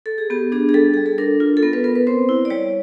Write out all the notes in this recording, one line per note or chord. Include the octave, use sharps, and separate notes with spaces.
A4
G#4
B3 G4
D4 G#4
G#4
G3 A4
G3 G#4
A4
D4 A#4
F4
A4
B3 A#4
B4
B3 A#4
B4
C4 C5
E4
D5
G3 C#5